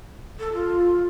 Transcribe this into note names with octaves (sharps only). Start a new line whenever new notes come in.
A4
F4